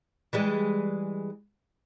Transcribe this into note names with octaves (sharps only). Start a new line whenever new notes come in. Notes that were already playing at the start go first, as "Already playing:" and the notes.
E3 G3 G#3